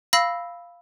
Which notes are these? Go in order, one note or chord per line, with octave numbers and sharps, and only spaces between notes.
F5 B5 E6 A#6 C7